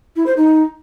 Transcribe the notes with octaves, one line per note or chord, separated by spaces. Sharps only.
E4
C5
D#4